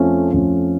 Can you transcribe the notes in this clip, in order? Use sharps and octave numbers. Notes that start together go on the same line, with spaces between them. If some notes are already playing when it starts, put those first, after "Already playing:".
Already playing: F2 F3 A3 C#4 F4
F2 F3 A3 C#4 F4